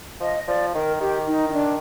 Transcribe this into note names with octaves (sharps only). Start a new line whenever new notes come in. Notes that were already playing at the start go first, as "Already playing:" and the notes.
F3 D#5
F3 D5
D#3 A#4
D#3 G4
D#4
D#4
D4